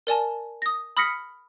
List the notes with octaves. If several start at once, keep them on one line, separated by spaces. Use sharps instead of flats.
A#4 D5 G#5 A5
D#6 A#6
B5 D#6 F6 A#6 B6 C#7